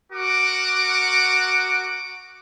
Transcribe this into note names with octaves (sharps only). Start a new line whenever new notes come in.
F#4 A#4 F#5 D6